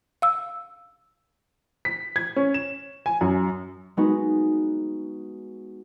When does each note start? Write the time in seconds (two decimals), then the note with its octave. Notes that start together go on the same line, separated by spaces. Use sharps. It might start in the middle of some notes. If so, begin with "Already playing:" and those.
0.22 F5 E6
1.85 B6
2.16 G#6
2.36 C#4
2.54 E7
3.06 G#5
3.21 F#2
3.97 G#3 B3 D#4 F#4